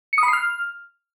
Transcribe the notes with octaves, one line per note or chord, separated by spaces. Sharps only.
C#7
D#6
B5
C7
F6